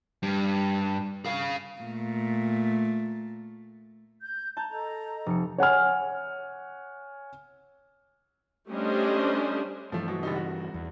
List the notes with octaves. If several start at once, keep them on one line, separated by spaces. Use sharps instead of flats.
G2
G#4 F5
A#2 A3
G6
A5 A#5 G6
A4 D#5 A#5
F1 C#7
C#5 F#5 G#5 F6
G3 A3 C#4 D4 C5 D#5
G2 E3 F3 A3
B2 F#3
F#1 G3 D#4
F#4
E2